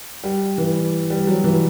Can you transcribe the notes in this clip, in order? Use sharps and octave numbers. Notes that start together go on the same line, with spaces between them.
G3
E3
G3
F#3
E3